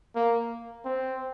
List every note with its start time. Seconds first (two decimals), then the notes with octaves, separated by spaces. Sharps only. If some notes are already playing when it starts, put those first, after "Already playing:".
0.15 A#3
0.85 C4